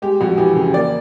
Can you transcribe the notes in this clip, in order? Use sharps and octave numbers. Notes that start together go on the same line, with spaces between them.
G#3 G4
F2 F#4
E3 G4
C#3 G#4
A#3 D5